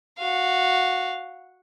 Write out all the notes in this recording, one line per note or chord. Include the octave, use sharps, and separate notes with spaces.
F#4 F5